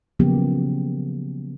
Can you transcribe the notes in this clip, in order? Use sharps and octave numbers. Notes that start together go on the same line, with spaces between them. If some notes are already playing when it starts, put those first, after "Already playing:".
C#3 F3 F#3 A#3 B3 G4